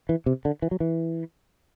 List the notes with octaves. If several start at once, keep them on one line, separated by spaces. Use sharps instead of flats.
E3
C3
D3
E3
F#3
E3